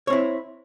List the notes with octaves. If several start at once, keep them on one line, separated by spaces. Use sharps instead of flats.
C4 E4 C#5